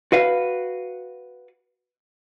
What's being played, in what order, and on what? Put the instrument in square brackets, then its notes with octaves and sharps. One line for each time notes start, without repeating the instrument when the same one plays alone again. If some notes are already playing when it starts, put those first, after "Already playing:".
[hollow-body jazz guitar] F#4 B4 F5